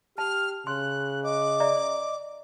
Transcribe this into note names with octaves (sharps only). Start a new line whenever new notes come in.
G4 A5 F6
C#3 C6 F#6
D#5 D6
D5 E5 A#5